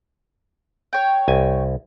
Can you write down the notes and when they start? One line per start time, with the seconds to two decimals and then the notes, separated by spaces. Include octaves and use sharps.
0.93 C#5 G5
1.28 C2 G#5